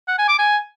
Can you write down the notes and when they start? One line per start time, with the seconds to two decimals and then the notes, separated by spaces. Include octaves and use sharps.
0.08 F#5
0.18 G#5
0.28 D6
0.38 G#5